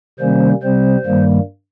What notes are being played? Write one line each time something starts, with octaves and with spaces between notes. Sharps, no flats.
C3 D#3 G3 A#3 C#4 C5
C3 G3 C4 C5
G2 D#3 G3 A#3